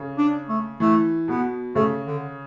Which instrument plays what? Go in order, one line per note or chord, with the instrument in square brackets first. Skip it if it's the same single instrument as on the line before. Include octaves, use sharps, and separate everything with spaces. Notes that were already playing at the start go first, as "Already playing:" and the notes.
Already playing: [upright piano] C#3
[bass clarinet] D4
A3
[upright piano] E3 [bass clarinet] A3
[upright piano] B2 [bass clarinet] B3
[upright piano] C#3 [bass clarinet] A3
[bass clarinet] D3